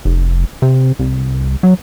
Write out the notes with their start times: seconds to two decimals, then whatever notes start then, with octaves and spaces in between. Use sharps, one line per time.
0.05 F1
0.62 C3
0.99 C2
1.63 F#3